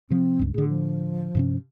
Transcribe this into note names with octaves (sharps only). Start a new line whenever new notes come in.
C3 F3 C4
C#2 G2
A2 D3 G#4
F3
G2 C3 C#4